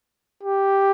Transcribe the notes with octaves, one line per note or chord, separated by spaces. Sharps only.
G4